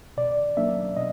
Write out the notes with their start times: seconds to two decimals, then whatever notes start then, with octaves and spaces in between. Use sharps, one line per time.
0.17 B2 D5
0.57 F#3 A#3 D4 E5
0.96 B2 D#5